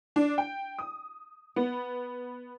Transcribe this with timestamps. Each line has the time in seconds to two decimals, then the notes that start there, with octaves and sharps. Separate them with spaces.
0.16 D4
0.38 G5
0.79 D#6
1.56 B3